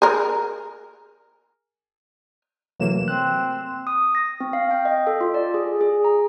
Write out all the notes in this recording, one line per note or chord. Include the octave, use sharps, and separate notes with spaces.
G#4 A#4
C3 E3 F#3 A3 A#3 E7
C4 F#6
D#6
A#6
C4
F5
G5
D#5
A4
F4
D5
G#4
G#4
A#5